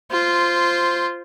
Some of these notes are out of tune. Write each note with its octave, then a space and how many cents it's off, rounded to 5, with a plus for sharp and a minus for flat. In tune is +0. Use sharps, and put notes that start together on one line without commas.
F4 -10 C5 +0